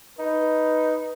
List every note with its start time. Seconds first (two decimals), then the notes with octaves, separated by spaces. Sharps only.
0.19 D#4 B4